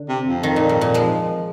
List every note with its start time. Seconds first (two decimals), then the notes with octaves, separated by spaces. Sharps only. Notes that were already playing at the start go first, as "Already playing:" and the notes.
Already playing: D3
0.09 C3
0.27 F2
0.43 D#3
0.56 A#2
0.69 G#2
0.81 A#2
0.94 F3 G#3